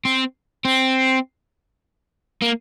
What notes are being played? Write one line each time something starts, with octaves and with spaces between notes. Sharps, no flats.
C4
C4
A#3